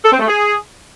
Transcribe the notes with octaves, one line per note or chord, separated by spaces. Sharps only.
A4
C4
A3
G#4